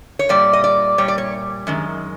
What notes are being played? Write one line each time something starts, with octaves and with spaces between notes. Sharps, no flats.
C#5
A#2 G3 D5
D#5
D5
A#2 G3 C#5
D5
C#5
F#2 D#3 G#3